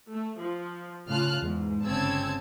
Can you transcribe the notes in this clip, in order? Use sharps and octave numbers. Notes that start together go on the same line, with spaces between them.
A3
F3
A2 C#3 F4 A5 F6 F#6
E2 G#2
G1 C#3 C4 A5 E6 G#6